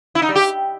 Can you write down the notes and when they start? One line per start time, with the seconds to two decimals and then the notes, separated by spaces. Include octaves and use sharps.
0.15 E4
0.22 D#4
0.29 G3
0.35 G4